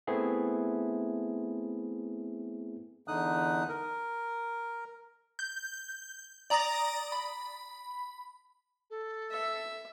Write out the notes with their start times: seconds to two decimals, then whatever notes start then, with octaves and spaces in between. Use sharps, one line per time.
0.07 A3 B3 C4 E4 G#4
3.08 E2 D3 D#4 D#6 F#6
3.69 A#4
5.39 G6
6.50 D5 A#5 D#6 A6 A#6
7.12 B5
8.90 A4
9.31 E5